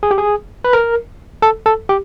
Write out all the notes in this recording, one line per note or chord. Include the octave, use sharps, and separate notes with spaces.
G#4
G4
G#4
B4
A#4
A4
A4
G4